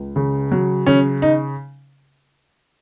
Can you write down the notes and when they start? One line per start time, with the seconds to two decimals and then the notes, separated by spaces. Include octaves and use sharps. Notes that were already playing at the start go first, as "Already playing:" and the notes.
Already playing: C#2
0.16 C#3
0.51 F#3
0.86 C#3 C#4
1.22 D#4